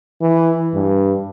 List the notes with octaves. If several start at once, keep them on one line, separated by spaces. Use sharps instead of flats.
E3
G2